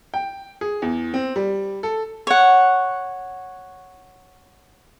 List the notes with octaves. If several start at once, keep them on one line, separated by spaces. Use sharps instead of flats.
G5
G#4
E2
C4
G3
A4
C#5 F#5